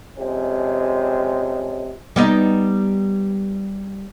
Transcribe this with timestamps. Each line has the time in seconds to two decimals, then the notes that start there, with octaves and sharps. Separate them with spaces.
0.18 F2 C3 G#3 C#4
2.16 G3 B3 D#4